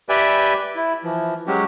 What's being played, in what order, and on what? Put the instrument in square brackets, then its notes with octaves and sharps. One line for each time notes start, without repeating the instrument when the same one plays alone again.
[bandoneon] G4 B4 D5 E5 G5 G#5
E4
E3 F3
F#3 G#3 C#4 F#4 G4